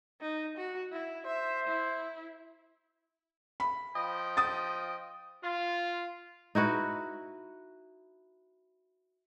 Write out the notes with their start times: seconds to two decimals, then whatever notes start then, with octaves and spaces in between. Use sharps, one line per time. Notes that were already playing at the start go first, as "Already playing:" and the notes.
0.21 D#4
0.57 F#4
0.92 E4
1.27 C5 E5
1.67 E4
3.60 B5
3.96 F3 D#5 G5
4.37 D#6 A6
5.43 F4
6.55 D#4 E4 F#4 B4